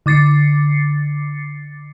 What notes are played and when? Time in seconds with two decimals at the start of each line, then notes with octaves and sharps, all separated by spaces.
0.06 D3 D6 A6 C7 C#7